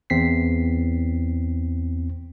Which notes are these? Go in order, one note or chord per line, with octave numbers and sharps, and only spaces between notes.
E2 C4 B6 C7